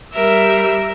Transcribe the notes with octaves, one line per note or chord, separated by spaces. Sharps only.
G3 A#4 E5